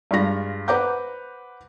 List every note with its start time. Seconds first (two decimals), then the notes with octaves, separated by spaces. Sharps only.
0.11 G2 G#3 F4 A#6
0.68 B4 C5 F#5 A#5 D6 G6